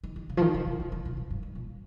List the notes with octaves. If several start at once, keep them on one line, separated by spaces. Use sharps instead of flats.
D#3
D#3
C#3
F3
D#3
C#3
C3
C#3
D#3
C3
A#2
G2
G2
A#2